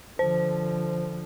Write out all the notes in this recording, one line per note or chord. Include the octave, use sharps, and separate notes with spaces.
D3 F3 C5